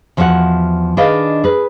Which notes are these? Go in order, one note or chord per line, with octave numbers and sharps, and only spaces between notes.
E2 F3 F#4 C#5 F5 F#5
D#3 D4 G#4 B4 D#5 F5
G#4 B4